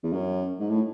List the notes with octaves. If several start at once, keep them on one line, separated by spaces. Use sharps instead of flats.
E2
F#2
G#2
A2